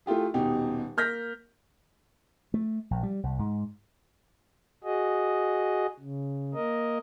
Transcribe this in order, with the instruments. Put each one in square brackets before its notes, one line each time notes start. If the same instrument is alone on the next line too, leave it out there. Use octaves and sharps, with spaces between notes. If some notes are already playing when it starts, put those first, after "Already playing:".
[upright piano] A3 E4 F4 G4 G#4
D#1 B2 D#4 G4
A#3 F6 G6 A#6 B6
[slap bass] A3
A#1
G3
C2
G#2
[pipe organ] F#4 G#4 D#5
C#3
A#3 A#4 D#5